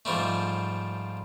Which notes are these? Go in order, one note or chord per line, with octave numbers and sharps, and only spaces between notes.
G#2 F3 G3 A3